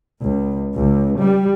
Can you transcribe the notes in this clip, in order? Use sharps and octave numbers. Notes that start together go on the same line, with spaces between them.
C#2
C#2
G3